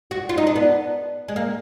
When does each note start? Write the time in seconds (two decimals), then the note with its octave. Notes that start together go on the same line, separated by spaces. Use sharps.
0.11 F#4
0.29 F4
0.38 D#4
0.47 D4
0.56 B3
1.28 G#3
1.36 A#3